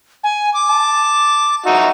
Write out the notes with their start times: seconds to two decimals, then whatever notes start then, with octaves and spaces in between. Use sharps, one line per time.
0.24 G#5
0.54 D6
0.69 A5
1.66 D#4 F#4 E5